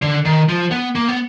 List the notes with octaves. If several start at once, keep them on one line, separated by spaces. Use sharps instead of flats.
D3
D#3
F3
B3
A#3
B3